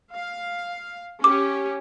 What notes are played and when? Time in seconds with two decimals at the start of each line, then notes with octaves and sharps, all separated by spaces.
0.12 F5
1.24 C#4 G4 D6